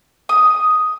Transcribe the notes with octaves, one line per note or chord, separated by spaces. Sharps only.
D#6